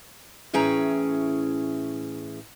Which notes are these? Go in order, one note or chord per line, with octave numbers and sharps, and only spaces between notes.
A2 E3 C#4 G#4 G5 A#5